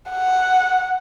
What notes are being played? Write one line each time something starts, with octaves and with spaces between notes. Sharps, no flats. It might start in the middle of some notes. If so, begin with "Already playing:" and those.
F#5